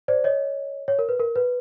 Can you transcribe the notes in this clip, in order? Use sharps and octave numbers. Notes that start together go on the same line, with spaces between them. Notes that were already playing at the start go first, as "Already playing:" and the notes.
C5 D5
C#5 D#5
C#5
A#4
B4
A#4
B4